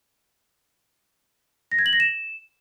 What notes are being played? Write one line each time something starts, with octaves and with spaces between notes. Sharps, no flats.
A#6
G#6
F#7
A#6
E7